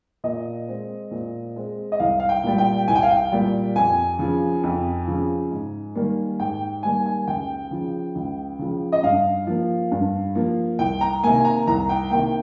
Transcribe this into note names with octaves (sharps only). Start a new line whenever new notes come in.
A#2 D#5
G#3 C4
A#2
G#3 C4
D#5
C2 F5
F5
G5
A#2 G3
G5
C2 G#5
G5
F5
G5
A#2 G3
F2 G#5
C#3 F3
F2
C#3 F3
G#2
D#3 G3 A#3
G#2 G5
D#3 G3 A#3 G#5
G#5
C#2 G5
C#3 F3
C#2
C#3 F3
D#5
G2 F5
F3 A#3
G2
F3 A#3
C2 G5
A#5
C3 D#3 A#3 G#5
A#5
C2 A#5
G5
C3 D#3 A#3 G5